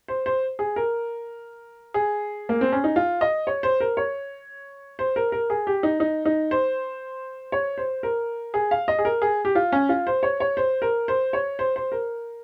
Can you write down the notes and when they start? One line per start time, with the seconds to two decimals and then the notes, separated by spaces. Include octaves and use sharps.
0.08 C5
0.26 C5
0.59 G#4
0.76 A#4
1.94 G#4
2.49 A#3
2.61 C4
2.72 C#4
2.84 D#4
2.96 F4
3.21 D#5
3.47 C#5
3.63 C5
3.80 A#4
3.97 C#5
4.99 C5
5.16 A#4
5.32 A#4
5.50 G#4
5.67 G4
5.83 D#4
6.00 D#4
6.25 D#4
6.51 C5
7.52 C#5
7.78 C5
8.03 A#4
8.54 G#4
8.71 F5
8.88 D#5
8.99 G#4
9.05 A#4
9.22 G#4
9.45 G4
9.55 F4
9.72 C#4
9.89 F4
10.07 C5
10.23 C#5
10.40 C#5
10.57 C5
10.82 A#4
11.08 C5
11.33 C#5
11.59 C5
11.76 C5
11.92 A#4